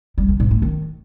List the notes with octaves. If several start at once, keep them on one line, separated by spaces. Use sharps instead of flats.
G3
D3
G#2
A3
D#3